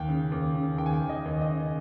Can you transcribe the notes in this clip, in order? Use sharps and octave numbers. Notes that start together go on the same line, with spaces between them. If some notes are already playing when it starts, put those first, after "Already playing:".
Already playing: D#2 G5
C#3
D#2
C#3
D#2 G5
G#5
G5
D#2
D#5
D#2
D#5
C#3